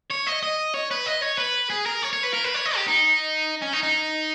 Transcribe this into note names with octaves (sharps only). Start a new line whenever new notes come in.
C#5
D#5
D#5
C#5
B4
D#5
C#5
B4
G#4
A#4
C#5
C#5
B4
A#4
B4
C#5
D#5
G4
D#4
C#4
D#4
D#4